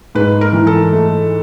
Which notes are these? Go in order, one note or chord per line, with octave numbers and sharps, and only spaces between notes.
G#2 B4
A#4
E3
A4
A3